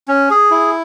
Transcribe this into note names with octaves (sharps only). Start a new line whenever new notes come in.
C#4
G#4
E4